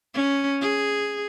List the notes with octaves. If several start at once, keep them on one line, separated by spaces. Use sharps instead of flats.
C#4
G#4